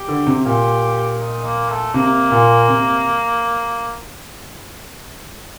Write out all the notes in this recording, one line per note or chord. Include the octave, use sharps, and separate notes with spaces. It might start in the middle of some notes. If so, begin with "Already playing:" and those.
Already playing: G4
D3
C3
A#2 G4
D#4
A#3
A3
C3 A#3
A#2
C3